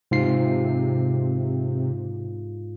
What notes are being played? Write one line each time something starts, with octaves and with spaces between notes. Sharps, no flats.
G#2 C3 F4 C7